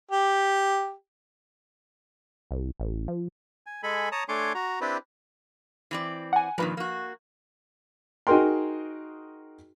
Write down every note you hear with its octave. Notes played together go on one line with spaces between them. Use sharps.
G4
C2
A1
F3
G#5
G#3 A4 G#5 B5
C#5 A5 A#5 D#6
A3 D4 C#5 G#5 C6 D6
F#4 A#5
C4 D4 E4 G4 B4
E3 C4 D5
F#5 G#5
G2 A#2 D#3 F3 B4
A#3 F#4
D#4 F#4 G#4 A#4 G5 C6